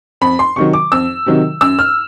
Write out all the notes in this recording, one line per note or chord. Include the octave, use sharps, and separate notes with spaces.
F2 B5
C6
C3 D#3 F#3 C#6
D6
F2 E6
C3 D#3 F#3
F#2 E6
F6